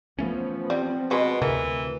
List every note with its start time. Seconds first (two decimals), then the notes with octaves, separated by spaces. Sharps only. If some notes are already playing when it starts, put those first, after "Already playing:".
0.19 E3 F3 A3 B3 C#4
0.70 G3 C4
1.11 B2 G#3
1.42 D2 C3 E3 A#4